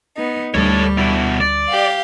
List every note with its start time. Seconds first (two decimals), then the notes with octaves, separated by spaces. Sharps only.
0.16 B3 D#4
0.55 D2 G3 D4 A4 C#5
0.98 B2 E4
1.40 D5
1.70 G4 F5